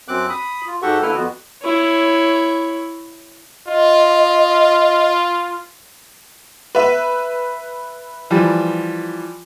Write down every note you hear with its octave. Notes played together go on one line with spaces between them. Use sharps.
F#2 C4 D6 F#6
B5 D#6
F4
G#2 F#4 G4 A4 F#5 C#6
D3 A#3 E4 A4 B4 F6
F2 B3 F#4
E4 C#5
F4 D#5
B4 E5
E3 F3 G3